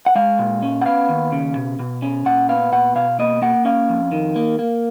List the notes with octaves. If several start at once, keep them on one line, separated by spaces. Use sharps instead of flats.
F#5
G#3 F5
A#2
C#4
F#5
B3 F5
D#2
C#3
B2
B2
C#4
A#2 F#5
B3 F5
A#2 F#5
B2 F5
A#3 D#5
A#3 F#5
C#4 F5
F2
D#3
A#3
A#3